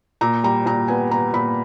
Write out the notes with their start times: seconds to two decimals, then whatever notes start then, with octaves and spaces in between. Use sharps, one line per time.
0.21 A#2 A#5
0.43 G3 A#5
0.66 A#2 A#5
0.88 B3 G#5
1.11 B3 A#5
1.33 A#2 B5